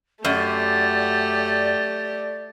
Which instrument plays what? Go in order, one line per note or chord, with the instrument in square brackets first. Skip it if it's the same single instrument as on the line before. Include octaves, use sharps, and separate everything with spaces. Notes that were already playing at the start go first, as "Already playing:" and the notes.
[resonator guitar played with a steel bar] F#2 [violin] A3 G4 [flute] D5